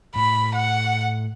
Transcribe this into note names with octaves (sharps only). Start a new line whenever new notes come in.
A2 B5
F#5